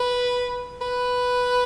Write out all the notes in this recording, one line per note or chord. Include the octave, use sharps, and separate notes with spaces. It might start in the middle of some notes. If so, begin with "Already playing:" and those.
Already playing: B4
B4